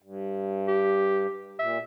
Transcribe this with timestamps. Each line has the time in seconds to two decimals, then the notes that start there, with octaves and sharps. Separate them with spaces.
0.02 G2
0.68 G4
1.59 A#2 E5